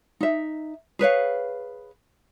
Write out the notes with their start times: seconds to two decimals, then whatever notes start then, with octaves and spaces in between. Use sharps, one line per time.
0.21 D#4 E5
0.99 G#4 B4 C#5 F5